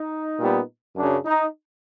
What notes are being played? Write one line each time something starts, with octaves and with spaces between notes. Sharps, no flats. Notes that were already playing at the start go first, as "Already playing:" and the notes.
Already playing: D#4
A#2 G3 B3
F#2 C#3 F#3 D4
D#4